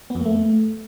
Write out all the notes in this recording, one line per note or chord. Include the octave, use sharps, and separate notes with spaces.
B3
F2
A#3
A3